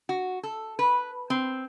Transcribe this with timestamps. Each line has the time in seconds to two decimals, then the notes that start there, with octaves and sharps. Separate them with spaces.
0.09 F#4
0.43 A4
0.79 B4
1.30 C4